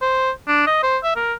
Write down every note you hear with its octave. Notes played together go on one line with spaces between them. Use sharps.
C5
D4
D#5
C5
E5
A#4